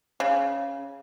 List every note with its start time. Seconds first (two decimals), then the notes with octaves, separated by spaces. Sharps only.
0.20 C#3